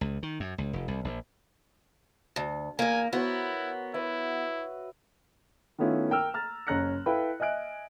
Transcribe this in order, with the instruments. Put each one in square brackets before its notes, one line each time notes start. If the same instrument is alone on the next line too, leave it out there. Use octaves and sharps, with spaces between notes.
[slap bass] C#2
D#3
F#2
C#2
F1
C2
A#1
[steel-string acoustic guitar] D2
[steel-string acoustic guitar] E2 A#3 [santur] A#4 [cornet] G#5
[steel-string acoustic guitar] B3 [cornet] E4 [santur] F#4 C5 C#5
[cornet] E4 [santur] B4 E5
[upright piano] D#3 A3 B3 C#4 E4 F4
A#4 G5 E6 F6
A#5 F6 A6
F#1 C#4 A#5 F#6 A#6 C#7
E4 A4 B4 F5 G5 B5
D#5 E5 G#5 F#6 D7